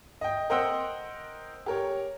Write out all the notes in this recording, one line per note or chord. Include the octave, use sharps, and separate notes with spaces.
D#5 G5
A#4 C5 D#5 F#5 G5 E6
G4 A#4 C#5